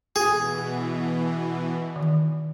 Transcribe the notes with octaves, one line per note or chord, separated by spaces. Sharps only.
B2 E3 G#4
D#3